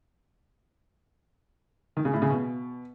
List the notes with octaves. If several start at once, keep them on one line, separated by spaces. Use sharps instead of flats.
D#3
C#3
A2
C#3
B2